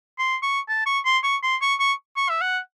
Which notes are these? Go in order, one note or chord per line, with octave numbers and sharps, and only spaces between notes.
C6
C#6
A5
C#6
C6
C#6
C6
C#6
C#6
C#6
E5
F#5